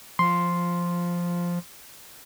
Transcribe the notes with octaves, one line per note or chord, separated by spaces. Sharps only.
F3 C6